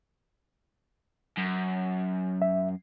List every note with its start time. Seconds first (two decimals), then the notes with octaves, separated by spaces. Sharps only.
1.37 F#2
2.42 E5